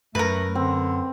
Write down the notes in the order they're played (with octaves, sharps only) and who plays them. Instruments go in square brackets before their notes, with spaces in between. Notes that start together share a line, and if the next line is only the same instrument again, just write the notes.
[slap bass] F#2 [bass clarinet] A3 [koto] A#4 B4
[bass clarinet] D3 [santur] C4